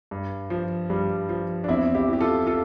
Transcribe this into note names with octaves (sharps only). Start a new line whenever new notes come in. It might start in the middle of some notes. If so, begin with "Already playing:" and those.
G2
F3
G2 G3
F3
D4
E2 C4 E4
E4 G4
E3 G4
F4 A4
F4 A4